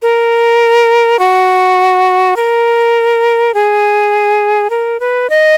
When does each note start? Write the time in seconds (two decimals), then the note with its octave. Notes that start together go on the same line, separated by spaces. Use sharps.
0.02 A#4
1.19 F#4
2.36 A#4
3.54 G#4
4.70 A#4
5.00 B4
5.30 D#5